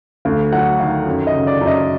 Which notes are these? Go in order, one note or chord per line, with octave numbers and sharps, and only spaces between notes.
D2 F5
F#3 F#5
D#3 F5
F#2
D#5
C#3
D5
F#2
D#5